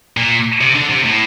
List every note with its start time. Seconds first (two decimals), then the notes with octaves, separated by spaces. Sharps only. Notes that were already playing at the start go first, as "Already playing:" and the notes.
0.17 A#2
0.61 C3
0.75 D3
0.89 C3
1.04 A2